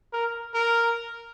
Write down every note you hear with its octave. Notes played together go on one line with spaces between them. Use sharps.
A#4
A#4